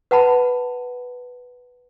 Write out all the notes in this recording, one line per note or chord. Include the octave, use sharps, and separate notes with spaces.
B4 F#5 A5 B5